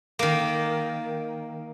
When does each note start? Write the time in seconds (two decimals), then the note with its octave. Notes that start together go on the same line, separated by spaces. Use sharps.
0.19 D#3 A#3